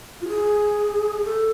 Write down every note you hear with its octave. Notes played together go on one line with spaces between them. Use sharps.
F4
G#4
A4